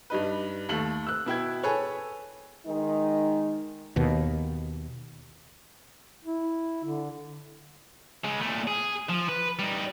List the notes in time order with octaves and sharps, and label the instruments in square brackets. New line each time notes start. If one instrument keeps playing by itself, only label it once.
[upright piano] G2 G3 D#4 B4
D#2 A3 F#7
E6 F#6
B2 E4 G5 G#6
G#4 A4 B4 C#5
[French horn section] D#3 G#3 D#4
[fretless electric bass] D#2 B2
[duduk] E4
D3
[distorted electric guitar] C#3 G#3
A#2 A3
G#4
F3
B4
G3 D#4